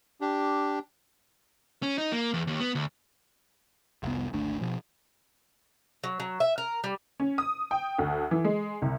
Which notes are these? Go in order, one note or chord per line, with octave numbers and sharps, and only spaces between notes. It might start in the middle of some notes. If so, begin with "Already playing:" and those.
D4 G4
C#4
D#4
A#3
E2
D#2
B3
D2
F1 C2 B3
G#1 D2 A3 D4
B2 F3
F#3
F#3
E5
A#4
G3
C#4
D#6
G5
D2
E3
G#3
C2